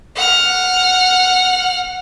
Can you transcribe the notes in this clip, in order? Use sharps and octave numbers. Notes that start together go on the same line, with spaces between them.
F#5 F6